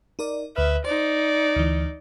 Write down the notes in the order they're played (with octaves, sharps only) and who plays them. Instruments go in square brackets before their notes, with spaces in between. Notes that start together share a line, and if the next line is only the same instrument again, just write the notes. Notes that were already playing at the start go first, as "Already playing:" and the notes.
[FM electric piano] D#4 A#4 D5
[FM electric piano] D2 F6 [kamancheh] B4 E5
[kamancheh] D#4 D5 [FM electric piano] C5
[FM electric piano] D2 E3